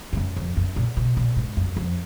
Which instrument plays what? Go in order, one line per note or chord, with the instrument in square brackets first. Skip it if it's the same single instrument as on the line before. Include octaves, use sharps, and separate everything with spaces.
[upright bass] G#2
F#2
F2
F#2
A#2
B2
A#2
G#2
F#2
F2